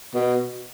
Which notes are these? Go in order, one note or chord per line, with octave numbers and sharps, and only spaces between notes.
B2